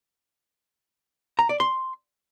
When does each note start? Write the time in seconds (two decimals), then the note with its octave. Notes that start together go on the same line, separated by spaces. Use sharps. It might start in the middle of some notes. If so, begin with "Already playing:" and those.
1.39 A#5
1.49 D5
1.60 C6